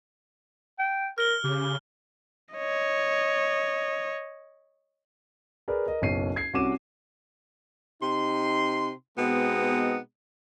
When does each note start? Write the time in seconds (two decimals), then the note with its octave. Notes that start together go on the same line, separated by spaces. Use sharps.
0.79 G5
1.18 A#4 F6 G7
1.44 C#3 G4
2.55 C#5 D#5
5.68 G#4 A#4 B4 D5
5.86 A#4 D#5
6.02 F#1 B1 C#5 C7 D#7
6.36 G#6 C7
6.53 C2 C#4 F#4 D6 D#7 E7
8.01 C3 D#4 C6
9.17 B2 G#3 B3 C4 D#4